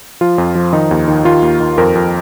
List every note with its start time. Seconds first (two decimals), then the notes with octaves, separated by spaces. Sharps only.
0.21 F3 F4
0.38 F2
0.55 F3
0.73 D#3 D#4
0.91 D#2
1.08 D#3
1.25 D#3 F4
1.43 D#2
1.60 D#3
1.78 F2 A#4
1.95 F2